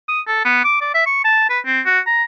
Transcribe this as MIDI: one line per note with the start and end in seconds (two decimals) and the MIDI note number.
0.09 0.21 87
0.27 0.40 69
0.45 0.64 59
0.64 0.78 86
0.81 0.94 74
0.94 1.02 76
1.07 1.22 85
1.24 1.47 81
1.50 1.59 71
1.66 1.81 60
1.85 2.00 66
2.07 2.23 82